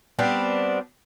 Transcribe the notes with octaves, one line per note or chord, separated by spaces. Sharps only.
G3 B3 C4 D4